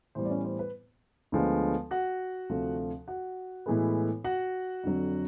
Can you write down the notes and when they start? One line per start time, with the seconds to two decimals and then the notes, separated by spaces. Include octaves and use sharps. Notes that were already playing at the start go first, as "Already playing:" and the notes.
0.15 A2 E3 G3 B3 C5
0.25 D5
0.30 C#4 C#5
0.45 C5
0.59 B4
1.32 D2 D3 F3 G#3 B3
1.91 F#4 F#5
2.50 D2 C3 F3 A3
3.08 F#4 F#5
3.66 A2 E3 G#3 B3
4.24 F#4 F#5
4.83 F2 D3 F#3